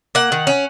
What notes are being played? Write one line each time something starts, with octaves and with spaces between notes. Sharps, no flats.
A#3 F#5
D#3
C#4